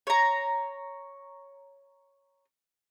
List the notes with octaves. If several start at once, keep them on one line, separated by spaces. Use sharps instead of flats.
C#5 A#5